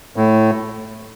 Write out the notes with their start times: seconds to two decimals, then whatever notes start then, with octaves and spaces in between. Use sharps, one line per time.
0.16 A2